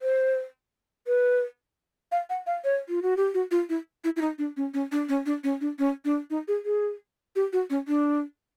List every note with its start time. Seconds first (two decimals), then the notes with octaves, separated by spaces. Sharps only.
0.02 C5
1.07 B4
2.12 F5
2.30 F#5
2.47 F5
2.64 C#5
2.89 F4
3.03 F#4
3.17 G4
3.34 F#4
3.51 F4
3.69 E4
4.04 E4
4.16 E4
4.21 D#4
4.38 D4
4.57 C#4
4.74 C#4
4.92 D4
5.09 C#4
5.26 D4
5.44 C#4
5.61 D4
5.79 C#4
6.05 D4
6.30 D#4
6.48 G#4
6.65 G#4
7.36 G4
7.53 F#4
7.70 C#4
7.88 D4